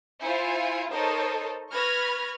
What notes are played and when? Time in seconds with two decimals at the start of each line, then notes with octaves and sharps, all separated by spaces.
0.22 E4 F4 C5 G#5 C#7
0.92 D#4 A4 A#4 C5 C#5 D#5
1.71 B4 B5 C#6 F6 G#6 A#6